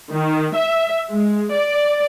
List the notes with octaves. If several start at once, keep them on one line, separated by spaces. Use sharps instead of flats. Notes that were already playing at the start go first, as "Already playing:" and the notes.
D#3
E5
G#3
D5